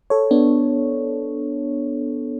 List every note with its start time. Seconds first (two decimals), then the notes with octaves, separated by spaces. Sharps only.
0.10 A4 C#5
0.31 B3 D4